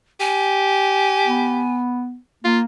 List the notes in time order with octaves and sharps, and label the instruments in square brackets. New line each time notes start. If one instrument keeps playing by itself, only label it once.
[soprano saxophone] G4 [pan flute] G#5
[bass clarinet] B3
[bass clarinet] A#3 [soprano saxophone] F4